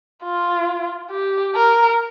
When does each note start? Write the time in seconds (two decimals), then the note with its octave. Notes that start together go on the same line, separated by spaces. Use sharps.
0.24 F4
1.11 G4
1.55 A#4